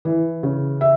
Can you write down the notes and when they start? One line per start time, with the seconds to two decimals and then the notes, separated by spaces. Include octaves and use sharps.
0.05 E3
0.43 C#3
0.81 E5